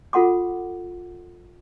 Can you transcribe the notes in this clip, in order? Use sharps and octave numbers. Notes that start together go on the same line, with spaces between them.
F4 A4 F#5 C6 D6